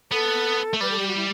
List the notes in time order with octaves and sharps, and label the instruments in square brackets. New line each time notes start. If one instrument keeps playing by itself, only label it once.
[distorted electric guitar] B3 [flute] A4
[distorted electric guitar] A3
[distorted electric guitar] G3 [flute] B4
[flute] A4
G4
F#4
E4